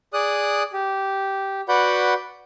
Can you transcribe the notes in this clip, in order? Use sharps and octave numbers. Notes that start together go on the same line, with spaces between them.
G#4 D5 D#6 F#6
G4
F#4 B4 D5 F#5 B5 G6